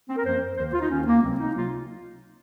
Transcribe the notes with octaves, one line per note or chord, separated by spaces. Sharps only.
C4
A#4
F#2 F3 A#3 C5
D#2 D#3 A#3 C5
F4
D#4
D#2 D#3 A#3 C#4
A#3
C#2 C3 F#3 A#3 C4
D#4
C3 F#3 A#3 F4